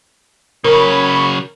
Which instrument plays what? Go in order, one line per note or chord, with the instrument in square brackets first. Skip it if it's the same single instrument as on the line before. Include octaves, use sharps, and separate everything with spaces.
[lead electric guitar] C#3 F#3 [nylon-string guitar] A#4 [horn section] C#5 B5